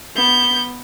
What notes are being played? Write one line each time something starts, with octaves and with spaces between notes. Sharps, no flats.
B3 G6